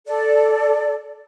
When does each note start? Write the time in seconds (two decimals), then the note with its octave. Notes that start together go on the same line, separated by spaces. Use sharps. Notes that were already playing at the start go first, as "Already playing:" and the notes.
0.07 A4 D5